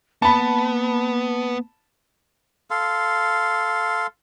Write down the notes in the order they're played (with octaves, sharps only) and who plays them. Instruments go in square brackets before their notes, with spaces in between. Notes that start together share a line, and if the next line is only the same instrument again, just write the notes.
[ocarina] A#3 [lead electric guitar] B3 [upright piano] A5 B5
[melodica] A4 F5 C6